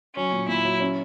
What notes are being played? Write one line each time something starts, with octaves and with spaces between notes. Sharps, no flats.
F#3 C#4
A#2
A#2 E4
F#3
C#4